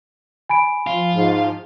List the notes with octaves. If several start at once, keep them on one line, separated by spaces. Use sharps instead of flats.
G#5 B5 D7
F3 F4
G#2